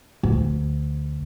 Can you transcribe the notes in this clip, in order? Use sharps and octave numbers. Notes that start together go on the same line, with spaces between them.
D2